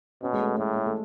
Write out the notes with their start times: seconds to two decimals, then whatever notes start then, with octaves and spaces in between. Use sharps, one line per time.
0.22 B2 C#4
0.33 G#3
0.41 A3
0.57 A2 G#3
0.75 A3
0.86 A3